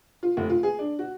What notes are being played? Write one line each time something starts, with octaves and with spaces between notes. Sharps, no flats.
F4
F1
F4
G#4
D4
F#4